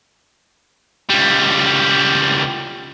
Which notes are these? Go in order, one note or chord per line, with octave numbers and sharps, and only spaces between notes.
C#2 G3